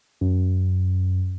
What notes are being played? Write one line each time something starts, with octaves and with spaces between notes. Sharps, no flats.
F#2